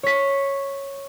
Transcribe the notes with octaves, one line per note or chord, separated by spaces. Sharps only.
C#5 B6